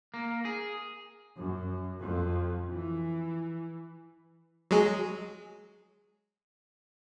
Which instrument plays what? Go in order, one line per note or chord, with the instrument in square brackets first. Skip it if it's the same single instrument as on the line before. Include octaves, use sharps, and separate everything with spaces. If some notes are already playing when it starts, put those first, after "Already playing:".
[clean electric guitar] A#3
G#4
[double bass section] F#2
F2
E3
[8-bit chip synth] F#3 G#3 G#4